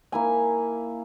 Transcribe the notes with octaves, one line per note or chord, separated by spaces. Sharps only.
A#3 E4 G#5